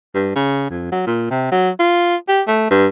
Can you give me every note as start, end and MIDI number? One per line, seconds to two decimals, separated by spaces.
0.15 0.35 43
0.36 0.68 49
0.70 0.88 41
0.92 1.02 54
1.07 1.29 46
1.31 1.49 48
1.52 1.70 54
1.80 2.16 65
2.29 2.42 67
2.47 2.67 57
2.71 2.87 43